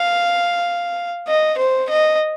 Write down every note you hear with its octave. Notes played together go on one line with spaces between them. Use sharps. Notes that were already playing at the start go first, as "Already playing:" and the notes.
Already playing: F5
D#5
C5
D#5